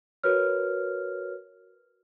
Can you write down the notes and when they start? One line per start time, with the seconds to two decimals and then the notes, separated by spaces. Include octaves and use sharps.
0.23 F#4 A#4 B4 C#5 F6